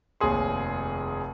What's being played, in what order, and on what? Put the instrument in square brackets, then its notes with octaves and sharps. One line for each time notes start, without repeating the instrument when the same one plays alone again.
[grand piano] F1 D#2 G#4 C6